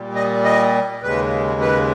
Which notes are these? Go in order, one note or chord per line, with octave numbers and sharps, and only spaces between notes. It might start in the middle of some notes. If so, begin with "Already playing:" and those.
Already playing: A#2 G3
D#5
D#5
D#2 C#3 G#3 B4
B4